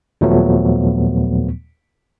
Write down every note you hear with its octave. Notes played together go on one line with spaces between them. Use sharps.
D#2 A#2 F3 F#3 A3 B3